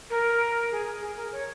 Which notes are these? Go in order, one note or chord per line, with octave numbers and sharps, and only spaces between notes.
A#4
G#4
G#4
A#4
C#5